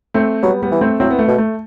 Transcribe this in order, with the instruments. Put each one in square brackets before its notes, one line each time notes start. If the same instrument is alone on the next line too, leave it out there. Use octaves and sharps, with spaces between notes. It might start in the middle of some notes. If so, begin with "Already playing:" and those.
[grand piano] A3 C4
[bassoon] F#3 [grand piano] G3 B3
[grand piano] G3 B3
[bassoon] E3
[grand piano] A3 C4
[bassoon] F#3 [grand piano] C4 E4
[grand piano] B3
A3
[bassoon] B2
[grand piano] A3